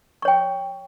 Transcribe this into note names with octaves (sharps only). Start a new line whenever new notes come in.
C#5 G5 C#6